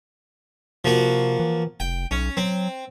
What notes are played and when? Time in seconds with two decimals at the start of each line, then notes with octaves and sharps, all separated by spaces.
0.85 C3 F3 A#3 F#4
1.39 E3
1.80 F1 G5
2.11 B1 C#4
2.37 F#3 C4